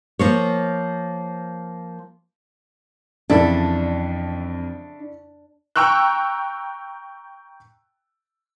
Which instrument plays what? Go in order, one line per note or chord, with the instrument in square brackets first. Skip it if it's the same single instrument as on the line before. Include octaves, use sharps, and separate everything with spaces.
[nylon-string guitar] F3 A#3 C#5
[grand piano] F2 E3 [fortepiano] C#3 E4 A4 [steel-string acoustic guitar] D4
[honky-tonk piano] G5 A#5 C#6 E6 F#6